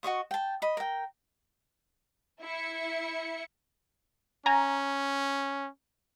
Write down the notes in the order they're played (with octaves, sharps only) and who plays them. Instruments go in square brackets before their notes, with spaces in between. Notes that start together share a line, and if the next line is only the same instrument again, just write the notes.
[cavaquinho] F#4 D#5 C#6 D#6
G5 A5
D#5 B5
A#4 G5
[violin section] E4 E5 C#7
[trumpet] C#4 [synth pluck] G#5 A#5